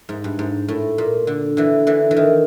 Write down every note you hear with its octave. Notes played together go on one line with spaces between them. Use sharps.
G#2
G2
G#2
A2
A#2
D3
D3 E3
D3 E3
E3
D#3